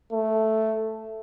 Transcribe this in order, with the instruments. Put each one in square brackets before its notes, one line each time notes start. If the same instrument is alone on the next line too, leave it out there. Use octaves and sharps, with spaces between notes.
[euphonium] A3